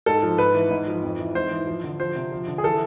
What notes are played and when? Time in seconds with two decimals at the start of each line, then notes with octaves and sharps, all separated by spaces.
0.06 G#2 A4
0.23 F3
0.38 G#2 B4
0.55 E3
0.71 G#2
0.87 F3
1.03 F2
1.19 E3
1.35 G#2 C5
1.51 E3
1.67 F3
1.84 D3
2.00 F3 C5
2.16 C3
2.32 F3
2.48 D3
2.58 G#4
2.64 E3 A4